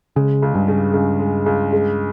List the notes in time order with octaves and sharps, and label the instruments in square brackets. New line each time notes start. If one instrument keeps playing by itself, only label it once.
[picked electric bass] C#3 [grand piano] G#3
[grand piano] C#2
[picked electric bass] G2
[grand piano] C#3
C#2
G#3
C#2
G#3